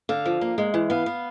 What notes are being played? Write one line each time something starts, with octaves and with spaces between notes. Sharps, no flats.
D3 F5
F3
A#3
G#3
E3
B3 F5
B3